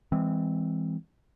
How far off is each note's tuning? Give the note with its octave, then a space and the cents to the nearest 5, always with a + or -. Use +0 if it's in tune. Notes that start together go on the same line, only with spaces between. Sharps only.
E3 +0 G#3 -30 C4 -10